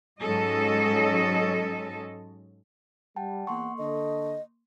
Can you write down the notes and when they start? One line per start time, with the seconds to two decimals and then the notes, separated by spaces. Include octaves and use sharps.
0.20 G#2 F#3 C#4 A4 D#5
3.16 G3 F#5 G5 A5
3.47 E2 A#3 F#5 C6 C#6
3.78 D3 A4 D#5